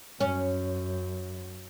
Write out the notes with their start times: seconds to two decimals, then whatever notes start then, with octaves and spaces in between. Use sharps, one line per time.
0.21 F#2 C#4